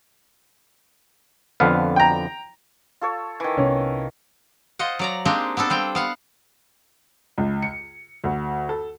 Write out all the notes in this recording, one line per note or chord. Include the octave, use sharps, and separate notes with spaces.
F2 D3 B3 F5
G5 A#5
F4 A4 C#5
D#3 E3
C2 C3 B3 C#4
F4 C5 D#5 F#5
F#3 D5 A#5
G#3 A#3 C4 D4 D#4 G4
B3 C4 D4 A4
G3 C4 G5
B3 F5 F#5
C#2
C#7
D2
A4